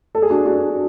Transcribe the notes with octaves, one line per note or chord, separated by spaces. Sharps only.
A4
G#4
D4 F#4
D4 F#4